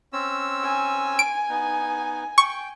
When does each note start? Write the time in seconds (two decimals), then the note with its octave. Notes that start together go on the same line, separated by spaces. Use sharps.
0.13 C4 C#4 E6
0.63 G#5
1.19 D7
1.50 B3 D#4
2.38 G5 C#6